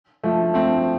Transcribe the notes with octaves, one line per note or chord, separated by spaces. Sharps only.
F3 A3
A3 C4